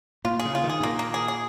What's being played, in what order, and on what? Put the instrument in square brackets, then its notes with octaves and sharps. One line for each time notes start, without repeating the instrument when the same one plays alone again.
[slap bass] A#2 [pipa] F4
[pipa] G#4
[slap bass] C#3
[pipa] F4
[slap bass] D#3
[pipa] G#4
[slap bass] G#2
[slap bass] A#2 [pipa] A#3
[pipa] A#3
G#4
G#4